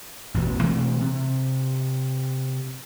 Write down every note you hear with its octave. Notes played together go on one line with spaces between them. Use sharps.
A1 E2 B2 E3
B2 E3 A3 C4
C3